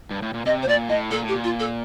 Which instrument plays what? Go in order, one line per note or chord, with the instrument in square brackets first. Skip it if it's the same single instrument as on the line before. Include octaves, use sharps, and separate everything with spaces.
[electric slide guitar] G2
A2
A#2
[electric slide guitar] C3 [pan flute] D#5
[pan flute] C5
[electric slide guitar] A#2 [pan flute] D5
[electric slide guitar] A2 [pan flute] D#5
[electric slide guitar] A#2 [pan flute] A4
[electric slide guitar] A2
[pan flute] G4
[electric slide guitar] A#2
[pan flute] F4
A4